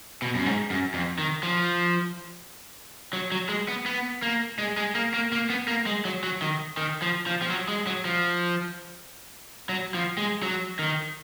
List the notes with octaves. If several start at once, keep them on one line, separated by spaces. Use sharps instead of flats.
B2
F#2
G#2
F#2
F2
D#3
F3
F#3
F#3
G#3
B3
B3
A#3
G#3
G#3
A#3
A#3
A#3
B3
A#3
G#3
F#3
F#3
D#3
D#3
F3
F3
F3
F#3
G#3
F#3
F3
F#3
F3
G#3
F#3
D#3